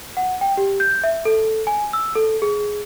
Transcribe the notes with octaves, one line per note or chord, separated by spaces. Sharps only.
F#5
G5
G4
G6
E5
A4
G#5
E6
A4
G#4